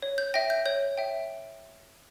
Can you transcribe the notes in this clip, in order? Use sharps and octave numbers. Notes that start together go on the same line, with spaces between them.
C#5
G6
E5 G5 A#6
G6
C#5 G6
E5 G5